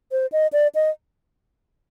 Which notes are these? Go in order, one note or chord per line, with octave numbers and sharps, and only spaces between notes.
C5
D#5
D5
D#5